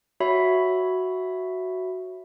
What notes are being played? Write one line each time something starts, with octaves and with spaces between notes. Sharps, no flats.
F#4 C#5 E5 B5